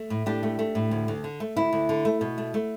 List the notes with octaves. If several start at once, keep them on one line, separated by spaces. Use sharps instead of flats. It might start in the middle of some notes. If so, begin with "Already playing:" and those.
Already playing: A3
A2
A2 D4 G4
A3
A3
A2
D2
D2
D3
A3
D2 E4
D2
D3
A3
B2
A3
A3